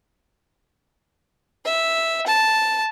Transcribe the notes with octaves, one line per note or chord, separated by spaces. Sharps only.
E5
A5